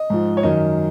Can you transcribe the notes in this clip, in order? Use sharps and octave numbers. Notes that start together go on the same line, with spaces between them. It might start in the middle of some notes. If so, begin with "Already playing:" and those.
Already playing: D#5
G#2 F3
C#5
F#2 D#3 D#5